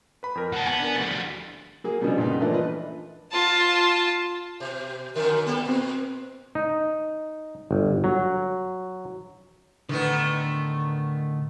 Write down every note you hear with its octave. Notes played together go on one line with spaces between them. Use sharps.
B4 B5
F2 A#4
D#3 F#5 A5
B3 G#5
D4 A#4
D2 F3 G3 A6
F#3 A#3 G#4
B2 D3 F3 G3 C#4
G2 A#2 C#3 B3 D#4
E3 F3 A3 A#3 D4
F4 B4 D#5
F4 A5
B2
F#2 D3 A#4
G3 B3 A4
A#2 C4
D#4
G1
F#3
A2 D3 D#3 A3 B3